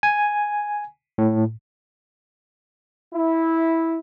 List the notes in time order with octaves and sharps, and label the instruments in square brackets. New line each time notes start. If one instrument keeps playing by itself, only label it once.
[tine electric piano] G#5
A2
[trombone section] E4